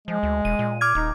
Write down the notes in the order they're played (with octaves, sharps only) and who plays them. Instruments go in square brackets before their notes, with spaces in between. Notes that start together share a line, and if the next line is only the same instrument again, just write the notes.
[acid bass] F3 [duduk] G#3
[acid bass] D2
[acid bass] E1 [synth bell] D#7
[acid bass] A#2
[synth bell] D6 F6 G#6
[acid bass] D#1 [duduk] D#4